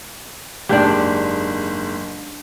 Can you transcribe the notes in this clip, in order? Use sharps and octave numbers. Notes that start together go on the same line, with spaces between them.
F#1 G#2 D4 G4 G6